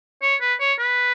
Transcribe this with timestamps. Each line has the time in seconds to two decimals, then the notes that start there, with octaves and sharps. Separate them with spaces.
0.22 C#5
0.41 B4
0.60 C#5
0.79 B4